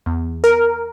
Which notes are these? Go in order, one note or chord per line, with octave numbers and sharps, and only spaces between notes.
E2
A#4